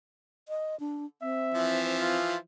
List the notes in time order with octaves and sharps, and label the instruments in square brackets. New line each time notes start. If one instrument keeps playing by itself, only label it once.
[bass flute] D#5
D4
[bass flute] C4 [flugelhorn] E5
[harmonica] E3 F3 E4
[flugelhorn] F4